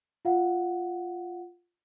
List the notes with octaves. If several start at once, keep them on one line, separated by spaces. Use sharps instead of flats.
F4 F5 F#5